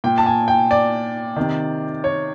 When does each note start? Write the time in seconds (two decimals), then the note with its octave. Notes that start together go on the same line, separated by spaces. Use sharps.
0.04 A#2 G5
0.18 A5
0.26 G#5
0.48 G5
0.71 D5
1.36 C3 D#3
2.04 C#5